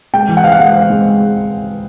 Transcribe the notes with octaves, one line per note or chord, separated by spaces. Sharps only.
G#3 G5
E3
F#5
C4 F5
F#5
G#3
C4
G#3